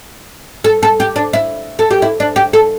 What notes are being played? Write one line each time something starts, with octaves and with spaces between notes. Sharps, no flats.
A4
A4
G4
D4
E4
A4
G4
E4
D4
G4
A4